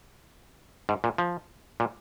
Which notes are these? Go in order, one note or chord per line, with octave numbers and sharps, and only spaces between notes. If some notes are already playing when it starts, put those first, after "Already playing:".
G#2
A#2
F3
A#2